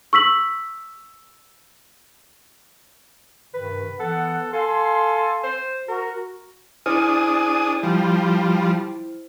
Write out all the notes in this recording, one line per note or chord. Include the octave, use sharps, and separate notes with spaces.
C#6 E6 B6 F#7
G2 C3 D#3 B4
E3 B3 A4 F#5
A4 F5 G#5 C6
C5
F#4 A#4
D4 E4 G#4 C5 D#6 F6
F3 G3